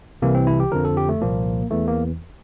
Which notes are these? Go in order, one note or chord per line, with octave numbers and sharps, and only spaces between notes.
C2 C3 E3 A#3
C4
E4
G4
F2 D3 F3 A#4
A4
G4
A3
C2 A#2 F3 A#3
E2 E3 A3
A#3